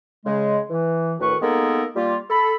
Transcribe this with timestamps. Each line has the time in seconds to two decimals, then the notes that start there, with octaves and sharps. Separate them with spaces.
0.26 C#3 G#3
0.70 E3
1.20 D2 A2 D#3 F#4 B4 C#6
1.42 G#3 A#3 B3 D#4 A4 A#4
1.95 G3 A#3 F4
2.30 A4 B5